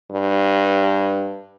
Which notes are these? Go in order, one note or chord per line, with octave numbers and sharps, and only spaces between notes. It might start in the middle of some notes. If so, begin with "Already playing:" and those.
G2